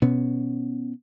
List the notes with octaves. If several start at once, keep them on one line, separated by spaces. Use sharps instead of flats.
B2 B3 C#4